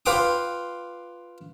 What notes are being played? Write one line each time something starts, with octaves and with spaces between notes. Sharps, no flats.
F4 B4 G5 C6 D6 D#6